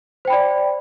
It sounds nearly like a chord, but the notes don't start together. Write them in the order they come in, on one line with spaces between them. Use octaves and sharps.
C5 G5 B5 D5